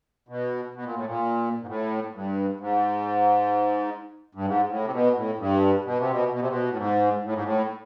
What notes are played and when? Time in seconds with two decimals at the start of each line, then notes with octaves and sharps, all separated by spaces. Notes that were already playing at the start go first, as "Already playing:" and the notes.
0.28 B2
0.74 B2
0.85 A#2
0.95 A2
1.05 A#2
1.61 G#2
1.67 A2
2.14 G2
2.60 G#2
4.35 G2
4.45 G#2
4.69 A2
4.85 C3
4.93 B2
5.15 A2
5.39 G2
5.85 B2
5.98 C3
6.11 B2
6.32 B2
6.40 C3
6.49 B2
6.70 A2
6.77 G#2
7.24 A2
7.34 G#2
7.44 A2